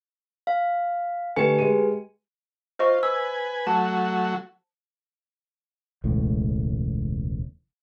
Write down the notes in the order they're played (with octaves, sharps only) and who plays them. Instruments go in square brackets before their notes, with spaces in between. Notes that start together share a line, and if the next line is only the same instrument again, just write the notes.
[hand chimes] F5
[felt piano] D3 A3 C#7 [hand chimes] G4 B4 G#5
[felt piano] G#3 D#7
[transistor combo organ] F4 [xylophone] C5 D#5 C#6
[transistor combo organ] B4 G#5 [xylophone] E6
[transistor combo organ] F#3 A3 F#4 [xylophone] A5
[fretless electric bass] E1 C#2 A2